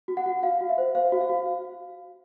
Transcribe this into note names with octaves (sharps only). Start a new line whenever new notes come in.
F#4
F#5
F#4
F#4 F5
F#4
E5
C5
C5 F5
F#4
F5
F#4